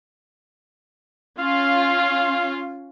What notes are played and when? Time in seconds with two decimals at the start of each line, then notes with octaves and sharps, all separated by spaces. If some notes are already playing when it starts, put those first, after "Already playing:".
1.39 C#4 F4 F5